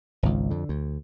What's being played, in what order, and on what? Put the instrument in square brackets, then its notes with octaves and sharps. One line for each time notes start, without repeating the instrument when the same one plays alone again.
[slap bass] G#1 C#2
F2 D3
D2